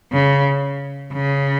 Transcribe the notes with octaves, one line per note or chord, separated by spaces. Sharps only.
C#3
C#3